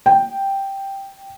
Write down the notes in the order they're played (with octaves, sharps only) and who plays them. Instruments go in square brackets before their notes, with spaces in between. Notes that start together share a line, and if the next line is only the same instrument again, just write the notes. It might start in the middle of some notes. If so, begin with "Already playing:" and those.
[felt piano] G5